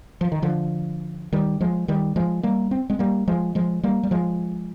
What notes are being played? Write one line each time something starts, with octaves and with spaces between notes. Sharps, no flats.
F3
D#3
D3 F3
D#3 G3
F3 G#3
D#3 G3
F3 G#3
G3 A#3
C4
G#3 C4
G3 A#3
F3 G#3
F3 G#3
G3 A#3
G3
F3 G#3